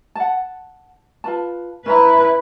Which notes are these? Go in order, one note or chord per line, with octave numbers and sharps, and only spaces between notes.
F#5 A5
F4 B4 A5
C#4 E4 B4 E5 A#5